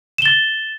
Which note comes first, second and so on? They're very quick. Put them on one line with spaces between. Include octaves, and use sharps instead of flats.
E7 G7 A6